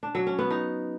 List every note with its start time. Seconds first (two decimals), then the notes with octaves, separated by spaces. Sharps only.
0.03 D4
0.15 F#3
0.27 C#4
0.39 B3
0.51 D#4